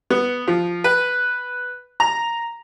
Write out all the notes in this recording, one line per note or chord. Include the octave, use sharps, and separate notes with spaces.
B3
F3
B4
A#5